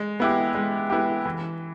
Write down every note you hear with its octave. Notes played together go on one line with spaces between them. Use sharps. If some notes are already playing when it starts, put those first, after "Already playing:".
Already playing: G#3
B3 E4 G4
G#3
B3 E4 G4
E3